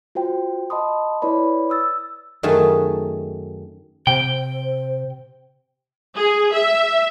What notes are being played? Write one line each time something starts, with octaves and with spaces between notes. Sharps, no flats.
F4 F#4 C5 G5
D#5 A5 B5 C6 D#6
E4 B4 C#5 D5 B5
D#6 E6 A6
F#2 D#3 A3 G#4 A5
C3 C5 G5
G#4
E5